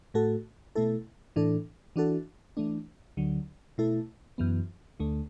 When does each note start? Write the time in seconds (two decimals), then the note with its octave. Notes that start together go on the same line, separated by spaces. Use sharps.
0.14 A2 A3 F#4 A4
0.76 B2 A3 E4 A4
1.36 A2 E3 D4 A4
1.96 E3 D4 F#4 A4
2.57 E3 A3 D4
3.17 D2 D3 F#3
3.78 B2 A3 E4 A4
4.38 F#2 E3 B3
5.00 D2 D3 A3